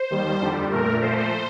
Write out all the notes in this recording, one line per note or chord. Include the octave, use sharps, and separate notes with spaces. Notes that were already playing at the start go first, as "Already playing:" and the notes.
Already playing: C5
D#2 D#3 G3
F2 D3 G3
A#2 A3 A#4
A#2 F3 A3 C5